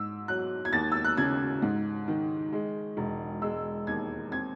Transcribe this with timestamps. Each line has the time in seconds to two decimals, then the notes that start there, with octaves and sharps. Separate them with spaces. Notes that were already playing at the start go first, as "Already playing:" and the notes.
Already playing: G#2 E6
0.28 F#3 F#6
0.65 G#6
0.73 D#2 A6
0.92 E6
1.04 F#6
1.17 C#3 G#6
1.62 G#2
2.08 D#3
2.53 G#3
2.97 E1
3.42 G#3 E6
3.87 D#2 G#6
4.31 C4 G#6